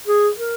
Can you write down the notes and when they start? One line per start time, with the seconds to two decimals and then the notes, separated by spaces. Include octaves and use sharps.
0.07 G#4
0.37 A#4